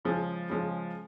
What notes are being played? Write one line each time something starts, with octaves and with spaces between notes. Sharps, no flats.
C#3 F3 G#3
C#3 F3 G#3